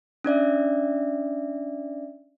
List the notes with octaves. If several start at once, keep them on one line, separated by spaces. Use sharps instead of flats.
C#4 D4 D5 E5